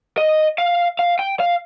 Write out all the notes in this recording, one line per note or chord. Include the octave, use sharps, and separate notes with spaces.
D#5
F5
F5
G5
F5